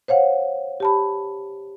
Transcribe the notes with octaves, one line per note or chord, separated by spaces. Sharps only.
C5 C#5 F5 F#5
G4 A5 B5